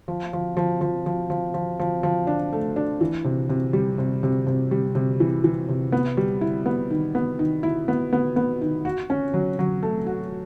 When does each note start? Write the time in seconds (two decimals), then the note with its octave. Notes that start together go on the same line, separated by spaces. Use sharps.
0.08 F3
0.33 F3
0.57 F3
0.81 F3
1.06 F3
1.30 F3
1.54 F3
1.79 F3
2.03 F3
2.27 D4
2.53 A3
2.76 D4
3.01 E3
3.25 C3
3.49 C3
3.73 G3
3.98 C3
4.23 C3
4.47 C3
4.71 G3
4.95 C3
5.20 E3
5.44 E3
5.69 C3
5.92 B3
6.17 G3
6.41 E4
6.66 B3
6.90 D#3
7.15 B3
7.39 D#3
7.63 E4
7.88 B3
8.13 B3
8.36 B3
8.61 D#3
8.85 F#4
9.10 C#4
9.34 F#3
9.59 F#3
9.83 A3
10.06 F#4